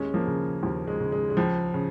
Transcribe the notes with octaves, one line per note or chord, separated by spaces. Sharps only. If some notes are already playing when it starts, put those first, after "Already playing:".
Already playing: D#2 G#3 C#4
F3 A#3
C#3
D#2 F3
G#3
C#3
G#3
G#3
C#2 F3
C#3